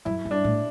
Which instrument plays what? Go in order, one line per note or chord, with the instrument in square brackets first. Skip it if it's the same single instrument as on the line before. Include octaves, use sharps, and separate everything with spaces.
[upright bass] F#2 [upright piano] E4
[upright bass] G2
[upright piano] D4
[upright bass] A2